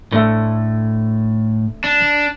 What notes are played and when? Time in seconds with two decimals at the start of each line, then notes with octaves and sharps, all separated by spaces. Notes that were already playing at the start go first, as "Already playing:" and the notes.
0.12 A2 D3 A3
1.84 D4